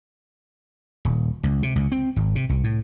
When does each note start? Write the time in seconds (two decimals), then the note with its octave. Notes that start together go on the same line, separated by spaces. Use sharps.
1.05 D#1
1.43 C#2
1.63 C3
1.76 C#2
1.92 C4
2.16 G#1
2.35 C3
2.49 C2
2.64 A2